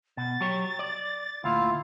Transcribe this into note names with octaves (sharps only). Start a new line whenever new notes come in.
B2 A6
F#3 G4 C#5
D5
D2 A#2 E4 F4 F5